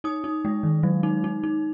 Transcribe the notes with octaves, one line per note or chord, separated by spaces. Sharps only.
D#4 D#6
D#4
G#3
D#3
F#3
D#4
D#4
D#4